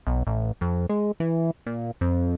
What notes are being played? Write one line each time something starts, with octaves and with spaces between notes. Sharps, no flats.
B1
A1
F2
G#3
E3
A#2
F2